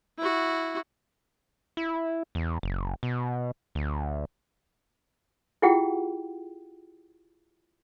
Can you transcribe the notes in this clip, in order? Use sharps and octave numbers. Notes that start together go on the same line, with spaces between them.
E4 F#4
E4
E2
F#1
B2
D2
E4 F4 G4 G#4 F#5 G5